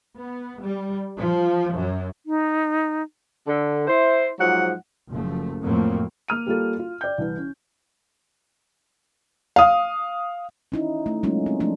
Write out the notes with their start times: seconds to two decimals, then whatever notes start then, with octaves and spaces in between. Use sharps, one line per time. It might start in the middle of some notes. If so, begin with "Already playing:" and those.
0.17 B3
0.60 G3
1.16 F3
1.73 F#2
2.26 D#4
3.47 D3
3.87 E4 C5
4.39 G#2 F3 F#3 F#5
5.10 F#1 F3 A3
5.62 F2 A2 F#3 A3 A#3 C4
6.28 A#3 F6 D#7
6.46 G3 A#3 F4 A4
6.79 F4
7.01 D5 G5 G6
7.18 C2 E3
7.38 C#4
9.56 F5 D#6
10.72 C#4 D#4 E4
11.06 A3
11.23 F#3 G#3 A#3 C#4 D#4 F4
11.46 C4
11.60 F3 A3 C#4 D4